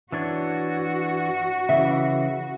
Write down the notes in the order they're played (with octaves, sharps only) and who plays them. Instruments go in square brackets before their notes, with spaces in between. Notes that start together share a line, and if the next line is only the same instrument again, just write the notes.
[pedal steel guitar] E3 D4 C#5 [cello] F#4
[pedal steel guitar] C#3 E3 [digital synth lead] E5